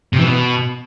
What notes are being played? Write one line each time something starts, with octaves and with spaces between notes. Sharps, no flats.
C3
E3
B2